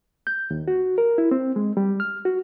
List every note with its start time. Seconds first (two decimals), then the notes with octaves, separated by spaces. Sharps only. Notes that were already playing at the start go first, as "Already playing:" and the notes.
0.27 G6
0.51 D#2
0.68 F#4
0.98 A#4
1.18 E4
1.31 C4
1.56 G#3
1.77 G3
2.00 F6
2.25 F#4